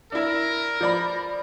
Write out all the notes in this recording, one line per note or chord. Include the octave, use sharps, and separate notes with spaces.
D4 E4 A#4
F3 D5 B5